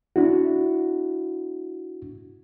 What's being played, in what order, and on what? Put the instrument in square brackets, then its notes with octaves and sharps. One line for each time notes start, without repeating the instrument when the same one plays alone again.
[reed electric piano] D4 E4 F#4